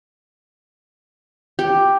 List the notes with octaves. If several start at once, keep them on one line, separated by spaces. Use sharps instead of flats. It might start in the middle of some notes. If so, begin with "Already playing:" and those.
G4